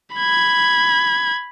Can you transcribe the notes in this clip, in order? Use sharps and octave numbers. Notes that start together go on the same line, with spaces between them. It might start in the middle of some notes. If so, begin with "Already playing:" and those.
B5 G#6